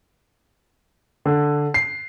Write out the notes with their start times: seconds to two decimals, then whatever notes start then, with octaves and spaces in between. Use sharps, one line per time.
1.25 D3
1.74 C7